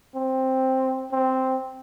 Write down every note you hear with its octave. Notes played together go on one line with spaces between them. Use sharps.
C4
C4